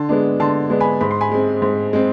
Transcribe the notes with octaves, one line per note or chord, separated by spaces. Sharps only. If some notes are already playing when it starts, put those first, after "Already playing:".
Already playing: D3 A5 C6
G#3 B3 D4
D3 A5 C6
G#3 B3 D4
G#5 B5
G#2 B5
C6
G#5 B5
G#3 C4
G#2
G#3 C4